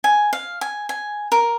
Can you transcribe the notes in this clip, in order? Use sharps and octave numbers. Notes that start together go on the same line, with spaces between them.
G#5
F5
G#5
G#5
A#4